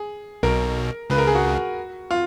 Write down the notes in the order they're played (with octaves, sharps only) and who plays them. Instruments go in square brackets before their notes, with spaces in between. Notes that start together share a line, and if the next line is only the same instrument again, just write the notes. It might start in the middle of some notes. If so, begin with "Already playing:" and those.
Already playing: [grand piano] G#4
[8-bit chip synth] B1 B2 [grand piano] A#4
[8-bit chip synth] C#2 C#3 [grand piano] B4
[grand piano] A#4
G#4
F#4
F4